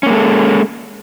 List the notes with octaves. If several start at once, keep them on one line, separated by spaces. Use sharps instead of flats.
G#3 A#3 C#4 A4